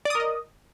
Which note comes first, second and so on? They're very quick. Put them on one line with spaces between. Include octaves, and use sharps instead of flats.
D5 D#6 A#4 D#5